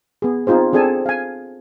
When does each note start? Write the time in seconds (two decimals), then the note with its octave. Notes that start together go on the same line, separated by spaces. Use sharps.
0.22 B3 G#4
0.47 C4 D#4 F4 G#4 C5
0.73 C4 D4 G#4 A4 G#5 A5
1.06 F5 G#5